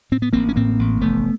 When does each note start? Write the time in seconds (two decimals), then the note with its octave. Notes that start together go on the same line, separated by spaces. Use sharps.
0.11 A2 C4
0.22 B3
0.33 A1 A#3 C4
0.49 C#4
0.56 A2 A#3 C4
0.79 A1
1.01 F1 A3 B3